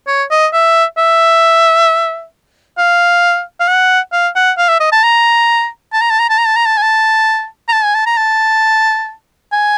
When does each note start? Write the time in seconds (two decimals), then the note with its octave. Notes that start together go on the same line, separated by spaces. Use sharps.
0.08 C#5
0.31 D#5
0.53 E5
0.98 E5
2.78 F5
3.60 F5
3.68 F#5
4.12 F5
4.36 F#5
4.58 F5
4.69 E5
4.80 D#5
4.92 A5
5.03 A#5
5.93 A5
6.01 A#5
6.10 A5
6.19 A#5
6.30 A5
6.38 A#5
6.47 A5
6.56 A#5
6.66 A5
6.77 G#5
6.82 A5
7.69 A#5
7.73 A5
7.84 G#5
7.95 A5
8.06 A#5
8.17 A5
9.52 G#5